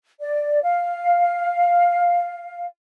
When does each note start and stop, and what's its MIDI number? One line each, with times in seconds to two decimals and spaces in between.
0.20 0.60 74
0.63 2.64 77